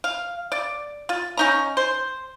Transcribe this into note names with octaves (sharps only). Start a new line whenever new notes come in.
F5
D5
F4
C#4 D#4 A#5
C5